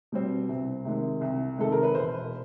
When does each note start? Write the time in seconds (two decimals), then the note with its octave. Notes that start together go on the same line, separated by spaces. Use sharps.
0.12 B2 G3 C4
0.49 C2
0.85 C3 D#3 G#3
1.21 C2
1.58 C3 D#3 G#3 A4
1.72 A#4
1.83 B4
1.95 E1 C5